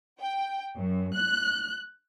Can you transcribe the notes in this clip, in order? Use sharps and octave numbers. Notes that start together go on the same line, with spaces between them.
G5
F#2
F#6